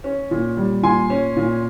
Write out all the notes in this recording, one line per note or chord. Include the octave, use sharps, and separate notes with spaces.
C#4
A#2
G3
A#2 G#5 C6
C#4
A#2